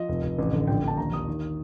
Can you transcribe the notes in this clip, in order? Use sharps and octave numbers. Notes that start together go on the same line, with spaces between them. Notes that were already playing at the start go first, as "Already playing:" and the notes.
Already playing: F3 D#5
F1
F1
A1
D3
A#1 G5
A#1 A5
D#2 A#5
D#2 D#6
D#3